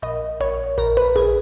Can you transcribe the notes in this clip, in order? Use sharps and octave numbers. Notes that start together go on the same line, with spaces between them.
A#1 D#5
A#1 C#5
A#1 A#4
B4
A#1 G#4